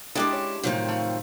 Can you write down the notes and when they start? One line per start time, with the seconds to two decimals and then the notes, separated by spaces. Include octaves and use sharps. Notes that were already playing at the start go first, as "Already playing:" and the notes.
0.15 G#3 D4 E4 G4 A#4 D5 D#5 A5
0.33 C#4
0.63 A1 C3 D#3 F3 F#3 F#5
0.88 A3 F5